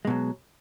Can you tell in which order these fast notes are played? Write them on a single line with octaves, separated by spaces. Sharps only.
G#3 B2 F#3